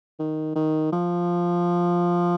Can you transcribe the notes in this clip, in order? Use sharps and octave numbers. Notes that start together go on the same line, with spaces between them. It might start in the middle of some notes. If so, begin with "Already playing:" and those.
D#3
D#3
F3